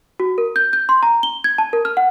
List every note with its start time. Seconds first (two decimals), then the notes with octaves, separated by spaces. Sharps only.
0.20 F#4
0.38 A#4
0.56 G6
0.73 G6
0.89 C6
1.03 A#5
1.23 G7
1.44 G#6
1.58 A5
1.73 A#4
1.85 F6
1.97 F#5